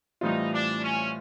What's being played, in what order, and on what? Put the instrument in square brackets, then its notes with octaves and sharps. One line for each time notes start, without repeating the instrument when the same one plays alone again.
[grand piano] A2 E3 G3 C4 F4 [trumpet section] D#4
[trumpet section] D4
C#4